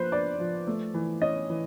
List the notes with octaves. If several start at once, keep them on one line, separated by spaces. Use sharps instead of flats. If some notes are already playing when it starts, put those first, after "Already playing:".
Already playing: F3 A#3 B4 C5
D4 D5
F3
A3
E3
C#4 D#5
E3